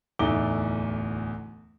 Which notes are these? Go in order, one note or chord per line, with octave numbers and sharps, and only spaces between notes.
D1 E2 A3 D#4 D6 G7